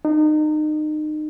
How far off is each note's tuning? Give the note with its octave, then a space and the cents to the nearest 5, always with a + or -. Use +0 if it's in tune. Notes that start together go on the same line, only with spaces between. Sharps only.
D#4 -30